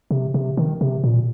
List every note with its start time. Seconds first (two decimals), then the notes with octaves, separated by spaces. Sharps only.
0.11 C3
0.34 C3
0.57 D#3
0.81 C3
1.04 A#2